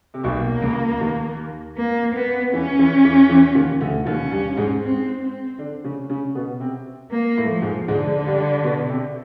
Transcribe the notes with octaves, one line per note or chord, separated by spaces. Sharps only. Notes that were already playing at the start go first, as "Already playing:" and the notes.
C3
B1 B2 A#3
C#2 C#3
D#2 D#3
A#3
B3
E2 E3 C#4
E2 E3
E2 E3
E2 E3
D#2 D#3
D2 D3
D#2 D#3 C#4
G2 G3
G#2 G#3
C4
C4
D3 D4
C#3 C#4
C#3 C#4
B2 B3
C3 C4
A#3
A2 A3
F3
G#2 G#3
G#2 D3 G#3
G2 G3
B2 B3
C3 C4